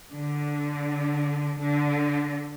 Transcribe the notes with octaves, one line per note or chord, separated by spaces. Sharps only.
D3
D3